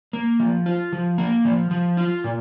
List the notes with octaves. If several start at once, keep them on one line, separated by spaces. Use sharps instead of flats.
A#3
F3
F4
F3
A#3
F3
F3
F4
A#2